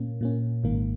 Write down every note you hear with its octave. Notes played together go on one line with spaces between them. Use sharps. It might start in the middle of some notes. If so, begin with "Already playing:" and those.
Already playing: A#2 A#3 C#4
A#2 A#3 C#4
G#1 G#2 D#3 A#3